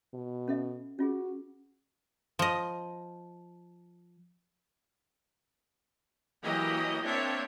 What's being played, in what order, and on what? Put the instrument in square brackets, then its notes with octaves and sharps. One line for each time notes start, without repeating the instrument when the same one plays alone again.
[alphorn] B2
[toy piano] C#4 A4 E5
[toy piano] C#4 F4 G#4 [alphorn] F#4
[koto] F3 D#5
[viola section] E3 F#3 A#3 G4 D#5
A#3 C4 D4 C#5 E5